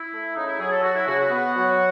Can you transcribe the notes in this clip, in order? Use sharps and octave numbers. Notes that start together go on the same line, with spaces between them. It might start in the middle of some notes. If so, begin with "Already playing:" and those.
Already playing: E4
A3
C#3 D#4
E4
F#3 G#4
A4
F#3 F#4
E4
C#3 F#4
F#4
B3
F#3